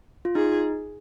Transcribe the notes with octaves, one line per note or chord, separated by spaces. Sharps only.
F4
D#4 G#4